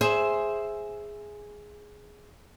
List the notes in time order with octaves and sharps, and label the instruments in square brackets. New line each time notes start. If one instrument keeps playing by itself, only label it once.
[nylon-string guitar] G#4 C5 E5